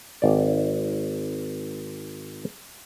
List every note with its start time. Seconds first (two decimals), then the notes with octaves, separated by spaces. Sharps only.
0.22 G#1 D5